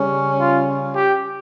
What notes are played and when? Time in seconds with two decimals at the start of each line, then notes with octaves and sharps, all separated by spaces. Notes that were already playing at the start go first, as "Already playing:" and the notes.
Already playing: C#3 G3 C#4
0.39 F4
0.94 G4